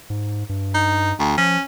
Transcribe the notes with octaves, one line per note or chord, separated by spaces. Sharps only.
G#2
G2
D#4
D2
F3 C#4